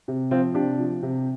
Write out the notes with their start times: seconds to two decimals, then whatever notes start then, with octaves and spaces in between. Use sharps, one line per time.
0.08 C3
0.31 F3 C4 F4
0.54 C3 D4 G4
0.79 F3
1.02 C3